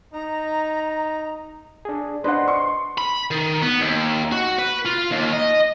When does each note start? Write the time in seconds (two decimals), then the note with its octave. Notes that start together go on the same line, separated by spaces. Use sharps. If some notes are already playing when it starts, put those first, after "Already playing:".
0.13 D#4 A#5
1.85 D4 G#4
2.24 D4 B4 C5 D#5 F#5 C6
2.48 C#6
2.98 B5
3.31 D#3
3.63 B3
3.80 D#2
4.32 F#4
4.59 B4
4.86 F4
5.11 D#2
5.33 D#5